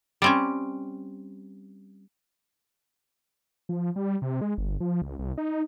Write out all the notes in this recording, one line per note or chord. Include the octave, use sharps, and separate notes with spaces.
G3 C4 C#4
F3
G3
C3
G#3
G1
F3
C#2
C2
D#4